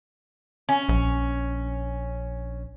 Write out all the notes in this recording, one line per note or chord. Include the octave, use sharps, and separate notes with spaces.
C#4
A#1